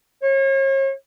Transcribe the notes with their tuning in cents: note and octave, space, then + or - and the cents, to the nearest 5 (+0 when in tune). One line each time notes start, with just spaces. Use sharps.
C#5 -40